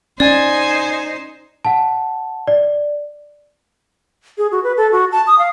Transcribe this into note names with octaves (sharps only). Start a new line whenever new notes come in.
C#4 D#4 C5 D5 G#5
F#5 A5
D5
G#4
F#4
B4
A4
F#4
A5
D#6
F5